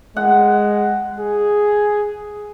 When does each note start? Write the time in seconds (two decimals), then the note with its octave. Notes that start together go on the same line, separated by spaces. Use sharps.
0.16 G#3 F#5
1.19 G#4